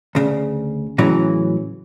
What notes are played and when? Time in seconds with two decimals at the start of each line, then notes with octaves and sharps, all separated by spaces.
0.15 D2 C#3
0.98 A2 C#3 E3 F#3